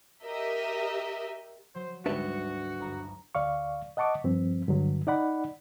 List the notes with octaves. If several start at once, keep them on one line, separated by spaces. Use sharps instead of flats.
G4 A#4 D#5 E5
F#3 C5
D2 G#2 G3 D4 F#4 B4 E5 C#7
G1 A#5
D2 D5 F5 C#6
D#5 F#5 A5 C#6 D6
G2 F3 C4
G2 D3 F#3
D#4 D5 F#5 B5